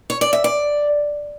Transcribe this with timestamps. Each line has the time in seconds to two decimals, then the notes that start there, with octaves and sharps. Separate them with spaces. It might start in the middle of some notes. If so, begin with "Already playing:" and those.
0.10 C#5
0.21 D5
0.33 E5
0.44 D5